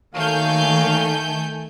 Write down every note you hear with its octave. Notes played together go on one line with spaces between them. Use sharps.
D#3 F#3 A3 A#3 F5 G#5 G6